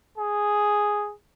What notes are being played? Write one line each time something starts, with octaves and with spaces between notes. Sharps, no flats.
G#4